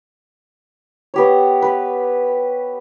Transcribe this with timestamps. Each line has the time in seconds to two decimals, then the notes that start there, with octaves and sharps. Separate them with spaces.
1.14 B3 G4 C#5
1.62 B4